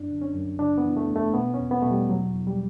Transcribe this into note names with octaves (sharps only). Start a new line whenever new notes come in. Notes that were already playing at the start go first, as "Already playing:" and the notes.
Already playing: F#2 D4
D3
C#4
F#2
C#3 D4
B3
E3
A3
E2
A3
B2 B3
C#4
E2
B3
B2 A3
G3
E2 F#3
E2
G3